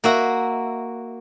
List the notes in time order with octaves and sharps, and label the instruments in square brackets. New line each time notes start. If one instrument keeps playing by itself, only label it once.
[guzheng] A#3 F#4 E5